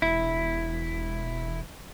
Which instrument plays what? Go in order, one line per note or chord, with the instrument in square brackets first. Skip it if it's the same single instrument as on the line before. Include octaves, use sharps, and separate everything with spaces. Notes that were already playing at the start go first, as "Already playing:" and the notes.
[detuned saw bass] E1 [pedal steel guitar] E4